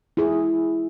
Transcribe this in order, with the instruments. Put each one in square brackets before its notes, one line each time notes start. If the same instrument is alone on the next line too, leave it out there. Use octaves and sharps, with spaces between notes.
[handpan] E4 G#4